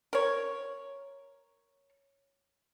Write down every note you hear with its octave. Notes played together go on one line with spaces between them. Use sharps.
A#4 C#5